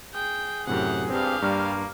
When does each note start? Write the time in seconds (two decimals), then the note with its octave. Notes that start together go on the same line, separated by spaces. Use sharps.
0.14 G#4 G5
0.67 F#2 A2 C3 G4 F#5
1.10 G#1 G2 C4 G4 F5
1.42 G2 G3 A#3 F6